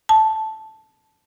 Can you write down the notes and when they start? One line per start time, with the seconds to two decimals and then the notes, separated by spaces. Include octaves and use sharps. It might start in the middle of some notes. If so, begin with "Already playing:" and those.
0.09 A5